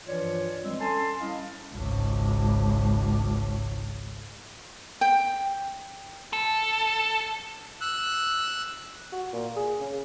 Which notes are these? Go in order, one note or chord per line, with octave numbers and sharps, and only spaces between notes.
G2 E3 F3 F4 C#5 D5
E3 G3 G#3 C4
C#4 A4 G#5 A5 C6
G3 C#4 E4 D#5 F5
G#1 C#2
G5
A4
E6 F#6
F#4
A#2
G#4
C#3